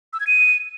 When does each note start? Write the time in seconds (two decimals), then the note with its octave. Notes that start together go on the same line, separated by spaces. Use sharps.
0.13 E6
0.20 G#6
0.27 D#7